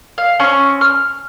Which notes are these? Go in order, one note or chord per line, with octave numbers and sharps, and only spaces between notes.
F5
C4 C#4 C#6
F6